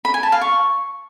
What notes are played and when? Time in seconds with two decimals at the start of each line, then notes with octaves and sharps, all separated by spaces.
0.05 B5
0.14 G#5
0.23 A5
0.32 F5
0.41 C#6